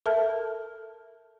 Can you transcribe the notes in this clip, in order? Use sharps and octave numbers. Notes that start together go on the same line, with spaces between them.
A4 A#4 E5 A5 F6